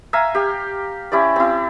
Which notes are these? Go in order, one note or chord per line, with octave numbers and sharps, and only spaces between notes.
E5 F5 G#5 A#5
G4 F5
C#4 E4 G4 D5
C4 E4